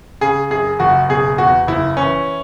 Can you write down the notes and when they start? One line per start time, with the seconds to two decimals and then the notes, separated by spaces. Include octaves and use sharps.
0.21 C#3 G#4
0.50 F#2 G#4
0.79 F#1 F#4
1.09 B2 G#4
1.38 E2 F#4
1.67 F#1 E4
1.97 E3 C#4